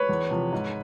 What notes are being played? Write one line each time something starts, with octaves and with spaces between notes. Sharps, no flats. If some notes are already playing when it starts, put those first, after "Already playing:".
Already playing: B4 C#5
E2
C3 F3
G#2